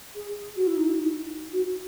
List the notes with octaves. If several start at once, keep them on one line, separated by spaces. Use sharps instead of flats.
G#4
F#4
E4
D#4
E4
D#4
F#4